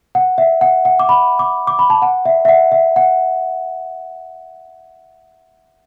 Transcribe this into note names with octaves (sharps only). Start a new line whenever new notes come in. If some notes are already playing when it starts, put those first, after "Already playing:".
F#5
E5
F#5
F#5
D6
B5
D6
D6
B5
A5
F#5
E5
E5
F#5
E5
F#5